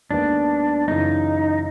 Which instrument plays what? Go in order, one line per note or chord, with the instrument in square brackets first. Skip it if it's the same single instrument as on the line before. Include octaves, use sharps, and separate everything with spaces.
[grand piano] D#2 D#3 G#3 B3 [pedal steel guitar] D4
[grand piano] F#2 C#3 E3 [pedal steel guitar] D#4